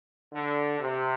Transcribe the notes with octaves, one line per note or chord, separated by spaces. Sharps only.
D3
C3